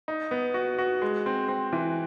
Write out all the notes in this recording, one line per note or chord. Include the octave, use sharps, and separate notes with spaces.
D#4
B3
F#4
F#4
G#3
C4
C4
E3